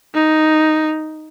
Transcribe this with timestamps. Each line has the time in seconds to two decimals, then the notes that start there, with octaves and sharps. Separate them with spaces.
0.14 D#4